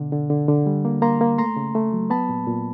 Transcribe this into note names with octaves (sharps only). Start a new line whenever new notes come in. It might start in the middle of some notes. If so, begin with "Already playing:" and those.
Already playing: B2 D3
D3
D3
D3
G3
A#3
A#3 A#5 C6
A#3
A3 A#5 C6
C#3
A3
F#3
B3 A5 B5
A#2
A#2